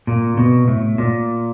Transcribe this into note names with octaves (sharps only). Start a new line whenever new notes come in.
A#2
B2
A2
A#2